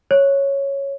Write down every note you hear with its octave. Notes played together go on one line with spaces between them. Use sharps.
C#5